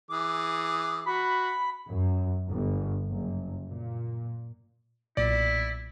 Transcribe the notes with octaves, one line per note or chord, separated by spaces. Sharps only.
E3 G#4 D6
F#4 B5
F#2
G1
F#1
A#2
B1 A#2 E4 D5